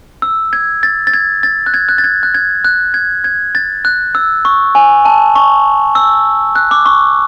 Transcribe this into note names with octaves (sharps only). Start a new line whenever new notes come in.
E6
G#6
A6
A6
G#6
A6
F#6
G#6
F#6
A6
G#6
F#6
G#6
F#6
G#6
G#6
A6
F#6
E6
C#6
G#5
A5
C#6
E6
F#6
D6
C#6